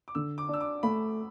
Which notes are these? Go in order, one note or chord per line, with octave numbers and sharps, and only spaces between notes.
D6
D3 E6
D6
D4
E6
D6
A3 B5